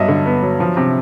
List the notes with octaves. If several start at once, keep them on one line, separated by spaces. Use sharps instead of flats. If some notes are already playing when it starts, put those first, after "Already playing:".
Already playing: G2 F#3 B3 D#5 E5
D3
B3
F#3
F3
C3